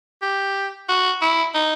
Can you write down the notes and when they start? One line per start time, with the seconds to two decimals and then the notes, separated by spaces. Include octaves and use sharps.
0.22 G4
0.89 F#4
1.21 E4
1.54 D#4